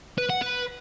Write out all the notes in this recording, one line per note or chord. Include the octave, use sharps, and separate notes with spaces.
B4
F#5
B4